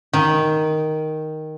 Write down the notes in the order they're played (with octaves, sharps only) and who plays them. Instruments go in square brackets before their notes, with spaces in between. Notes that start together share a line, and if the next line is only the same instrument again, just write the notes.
[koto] D#3